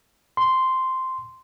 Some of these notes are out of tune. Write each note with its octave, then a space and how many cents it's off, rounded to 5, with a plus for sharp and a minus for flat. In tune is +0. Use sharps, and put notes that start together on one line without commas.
C6 -5